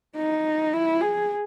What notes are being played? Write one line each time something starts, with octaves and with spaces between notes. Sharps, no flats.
D#4
E4
G#4